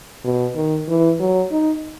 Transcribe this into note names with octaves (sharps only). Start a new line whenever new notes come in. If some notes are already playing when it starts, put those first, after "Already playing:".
B2
D#3
E3
F#3
D#4